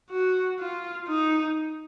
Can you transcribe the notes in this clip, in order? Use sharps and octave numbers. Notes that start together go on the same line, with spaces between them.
F#4
F4
D#4